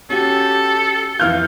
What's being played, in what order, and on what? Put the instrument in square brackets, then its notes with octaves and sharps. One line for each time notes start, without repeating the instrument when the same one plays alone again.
[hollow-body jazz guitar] C#4 F#4 [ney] G4 [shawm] A4
[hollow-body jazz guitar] F2 E3 F4 [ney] F5 [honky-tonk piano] F6 G6